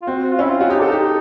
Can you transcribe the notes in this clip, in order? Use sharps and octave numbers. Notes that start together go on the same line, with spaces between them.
F4
C4 F#4
F#4
F4
C#4 E4
F4
F#4
D#4 G4
D4 A4
D#4 G4